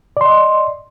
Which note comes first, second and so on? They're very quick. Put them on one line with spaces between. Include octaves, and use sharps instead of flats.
D5 C6 D#5